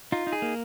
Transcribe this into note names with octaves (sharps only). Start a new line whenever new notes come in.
D#4 F4
D#4
G#4
A#3